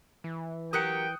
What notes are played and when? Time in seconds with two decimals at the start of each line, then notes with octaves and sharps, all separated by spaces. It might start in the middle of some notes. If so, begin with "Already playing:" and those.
0.24 E3
0.73 F#3 G4 A#4 G5 D#6 F#6 C#7